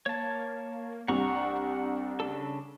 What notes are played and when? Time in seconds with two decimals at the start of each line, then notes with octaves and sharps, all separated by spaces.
0.06 A#3 C#5 A5
1.08 C2 D4 F#5 A#5 C#6
2.20 C#3 D4 A4